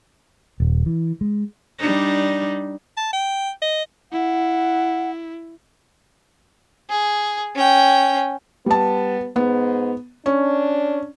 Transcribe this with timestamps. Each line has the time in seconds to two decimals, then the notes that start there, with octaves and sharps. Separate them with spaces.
0.60 D#1
0.86 E3
1.21 G#3
1.79 G3 D4 D#4
2.97 A5
3.13 G5
3.62 D#5
4.12 E4 F#5
6.89 G#4
7.55 C#4 G5
8.66 G3 B3 A5
9.36 G#2 B3
10.26 C#4 D4